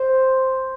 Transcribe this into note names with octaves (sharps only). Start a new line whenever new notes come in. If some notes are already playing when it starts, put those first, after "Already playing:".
Already playing: C5